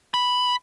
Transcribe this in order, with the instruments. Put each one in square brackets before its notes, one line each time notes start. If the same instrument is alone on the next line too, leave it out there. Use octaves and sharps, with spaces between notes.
[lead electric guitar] B5